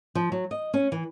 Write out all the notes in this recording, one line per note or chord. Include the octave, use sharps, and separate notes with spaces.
F3
F#3
D#5
C#4
E3